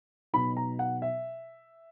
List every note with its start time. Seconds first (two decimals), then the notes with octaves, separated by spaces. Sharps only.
0.33 B2 F#3 B3 D#4 B5
0.57 A#5
0.79 F#5
1.02 E5